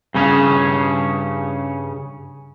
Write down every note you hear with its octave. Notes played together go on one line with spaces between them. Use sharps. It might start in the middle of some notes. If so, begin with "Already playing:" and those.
G2 C#3 C#4 G#4